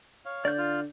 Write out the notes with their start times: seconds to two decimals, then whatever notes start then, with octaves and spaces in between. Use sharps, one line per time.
0.25 C#5 F5
0.45 D3 D5 G6
0.58 F4 F6